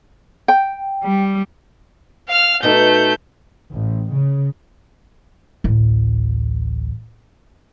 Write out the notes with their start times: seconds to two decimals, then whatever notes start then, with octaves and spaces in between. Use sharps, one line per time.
0.48 G5
1.04 G3
2.28 F5 F6
2.63 B2 A3 D#4 G6
3.74 A1
4.13 C#3
5.64 A1 D2